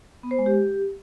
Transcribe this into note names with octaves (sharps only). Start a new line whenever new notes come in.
B3
C5
G#3
G4